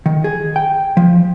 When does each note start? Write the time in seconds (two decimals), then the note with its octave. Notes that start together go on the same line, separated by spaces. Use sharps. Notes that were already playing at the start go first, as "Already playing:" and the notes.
0.06 D#3
0.24 G#4
0.56 G5
0.97 F3